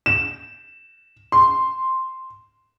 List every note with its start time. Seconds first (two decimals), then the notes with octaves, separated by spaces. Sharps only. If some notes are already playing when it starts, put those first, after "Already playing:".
0.06 E7
1.32 C6